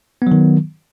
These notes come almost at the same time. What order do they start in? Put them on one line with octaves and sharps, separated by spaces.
B3 F#3 D#3